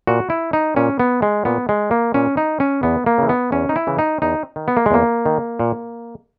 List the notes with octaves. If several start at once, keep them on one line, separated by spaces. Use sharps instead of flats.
A#2 F#4
E4
D#4
A#2 C#4
B3
G#3
A#2 B3
G#3
A#3
A#2 C#4
D#4
C#4
E2 B3
A#3
C#3 E3
B3
E2 C#4
D#4
E4
C#3 E3
D#4
E2 D#4
D#3
B3
A#3
G#3
E2 A#3
D#3
A#2